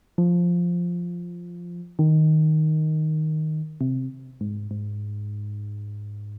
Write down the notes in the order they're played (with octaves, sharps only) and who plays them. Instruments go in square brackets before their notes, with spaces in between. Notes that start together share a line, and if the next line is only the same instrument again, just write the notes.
[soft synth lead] F3
D#3
C3
G#2
G#2